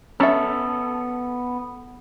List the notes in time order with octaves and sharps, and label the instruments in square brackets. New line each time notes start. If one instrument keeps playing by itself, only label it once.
[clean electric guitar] B3 A4 [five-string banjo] C#4 E5